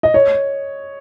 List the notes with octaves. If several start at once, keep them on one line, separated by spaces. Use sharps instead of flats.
D#5
C#5